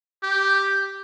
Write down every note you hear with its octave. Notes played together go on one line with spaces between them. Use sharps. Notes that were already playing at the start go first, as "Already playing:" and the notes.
G4